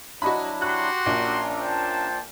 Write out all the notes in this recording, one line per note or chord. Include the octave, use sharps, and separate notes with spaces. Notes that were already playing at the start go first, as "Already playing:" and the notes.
F#3 D4 E4 F#4 D#5 B5
F#4 G4 C6 F#6
A#1 A#2 C#4 D4 A#5
C5 G5 A5